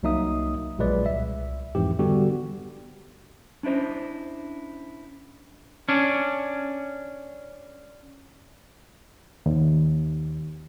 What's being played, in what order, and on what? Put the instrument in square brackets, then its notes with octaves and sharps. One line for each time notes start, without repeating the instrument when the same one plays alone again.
[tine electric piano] C2 F#3 A#3 D#4 E5 D#6
A#1 A#2 F#3 G#3 B4 D5
C2 E5
F2 G#2 E3 G4
D3 G3 B3 F#4 G4
[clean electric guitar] C#4 D4 E4 C5 D#5
C#4 D4
[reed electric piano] D#2